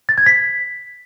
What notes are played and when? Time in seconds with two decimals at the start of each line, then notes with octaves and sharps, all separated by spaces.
0.09 A6
0.18 G#6
0.26 B6